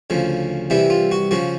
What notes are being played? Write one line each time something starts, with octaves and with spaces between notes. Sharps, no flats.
D2 C#3 F3
C2 C3 E3 G3 E4
F4
F#4
C#3 F3 F#4